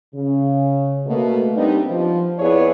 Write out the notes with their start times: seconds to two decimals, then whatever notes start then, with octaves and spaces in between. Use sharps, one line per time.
0.14 C#3
1.07 B2 A3 A#3
1.56 G3 B3 C4 D4 D#4 G4
1.91 F3
2.39 F2 B3 E4 G#4 C#5 D5